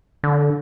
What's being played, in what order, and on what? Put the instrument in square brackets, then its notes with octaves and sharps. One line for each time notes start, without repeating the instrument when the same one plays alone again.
[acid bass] D3